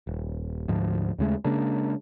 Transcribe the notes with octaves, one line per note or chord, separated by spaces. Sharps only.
D#1
D2 G#2 F3
D#2 C#3 G#3 A3
C#3 G#3 A#3 D4